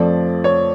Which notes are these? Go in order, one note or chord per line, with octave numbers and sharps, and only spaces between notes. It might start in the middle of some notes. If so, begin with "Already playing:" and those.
Already playing: F2 F3 A3 D5
C#5